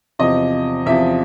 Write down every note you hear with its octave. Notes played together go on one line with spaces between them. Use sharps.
E2 C3 F3 D#5
E2 C3 F3 E5